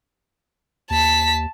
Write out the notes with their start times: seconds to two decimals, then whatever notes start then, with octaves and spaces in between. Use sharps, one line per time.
0.90 D#2 A5 B6